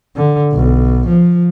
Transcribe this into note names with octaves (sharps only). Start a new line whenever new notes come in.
D3
B1
F3